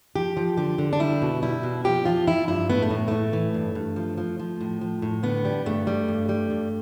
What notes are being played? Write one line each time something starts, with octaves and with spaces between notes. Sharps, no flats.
F3 G4
F3
D3 G4
D3
D4
G3 E4
B2
G3 E4
B2
F3 G4
F3 F4
F3 E4
G2 E4
A2 B3
A3
A2
A2 A3
E3
G2
G2
F3
F3
F3
A2
F3
A2
D3 B3
G3
G2 A3
G3
G2
G3
G2